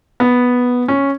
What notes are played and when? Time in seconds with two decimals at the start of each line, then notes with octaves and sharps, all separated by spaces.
0.20 B3
0.88 C#4